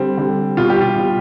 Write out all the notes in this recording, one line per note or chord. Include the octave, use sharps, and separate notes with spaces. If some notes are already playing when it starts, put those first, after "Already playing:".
Already playing: D3 G3 C4
D3 G3
B2 G3 F4
G4
F4
B2 G3